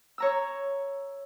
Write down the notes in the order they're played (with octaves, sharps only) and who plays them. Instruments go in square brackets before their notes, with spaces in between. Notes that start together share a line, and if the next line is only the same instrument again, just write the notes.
[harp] C#5 A#5 E6